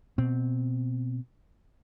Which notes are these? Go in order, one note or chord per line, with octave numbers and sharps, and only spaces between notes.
B2 C4